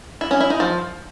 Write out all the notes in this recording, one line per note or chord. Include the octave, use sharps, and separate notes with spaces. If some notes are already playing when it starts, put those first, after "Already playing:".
E4
C#4
E4
D#4
F3